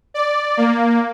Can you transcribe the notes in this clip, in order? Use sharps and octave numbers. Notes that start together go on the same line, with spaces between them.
D5
A#3